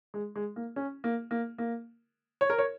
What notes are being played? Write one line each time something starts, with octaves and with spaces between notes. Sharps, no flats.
G#3
G#3
A#3
C#4
A#3
A#3
A#3
C#5
A#4
C#5